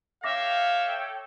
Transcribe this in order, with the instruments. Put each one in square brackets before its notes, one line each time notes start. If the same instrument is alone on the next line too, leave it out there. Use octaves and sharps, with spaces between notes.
[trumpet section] A4 C#5 G5 [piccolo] E5 [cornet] F5 [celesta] D6 A#6